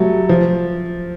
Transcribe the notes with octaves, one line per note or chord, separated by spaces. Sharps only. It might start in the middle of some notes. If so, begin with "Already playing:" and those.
Already playing: F#3 G3 A3
F3